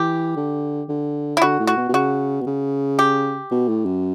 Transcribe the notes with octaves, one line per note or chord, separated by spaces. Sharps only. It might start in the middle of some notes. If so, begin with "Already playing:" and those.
Already playing: E3 G4
D3
D3
E4
D3 F#4
A2
F#4
B2
B2
C#3 F#4
B2
C#3
G4
B2
A2
F#2